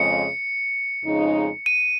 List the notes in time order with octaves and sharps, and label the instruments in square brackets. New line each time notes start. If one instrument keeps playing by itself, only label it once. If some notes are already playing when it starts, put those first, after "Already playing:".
Already playing: [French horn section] F2 C#3 G#3 [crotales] C#7
[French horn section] F2 C#3 G#3 D#4
[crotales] D#7